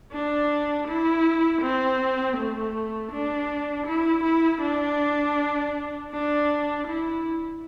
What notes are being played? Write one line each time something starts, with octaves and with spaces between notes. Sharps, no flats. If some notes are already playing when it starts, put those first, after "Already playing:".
D4
E4
C4
A3
D4
E4
E4
D4
D4
E4